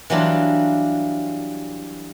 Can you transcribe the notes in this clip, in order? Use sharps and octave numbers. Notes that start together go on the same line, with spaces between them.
E3 F#3 G3 D4 F4